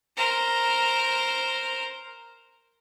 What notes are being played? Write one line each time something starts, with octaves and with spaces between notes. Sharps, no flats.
A#4 C5